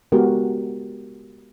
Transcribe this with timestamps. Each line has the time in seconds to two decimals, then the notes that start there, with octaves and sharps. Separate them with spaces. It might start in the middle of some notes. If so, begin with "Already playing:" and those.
0.12 G#3 B3 F#4 G4 A#4